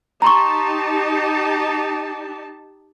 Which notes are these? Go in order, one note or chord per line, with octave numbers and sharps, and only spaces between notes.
D#4 G4 A5 A#5 C6 C#6